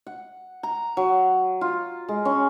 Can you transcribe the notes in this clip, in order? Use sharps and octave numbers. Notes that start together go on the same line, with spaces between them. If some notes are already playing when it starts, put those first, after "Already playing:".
F#5
A#5
F#3
F4
G#3
C#4